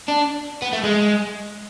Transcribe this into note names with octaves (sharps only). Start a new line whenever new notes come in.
D4
B3
A3
G#3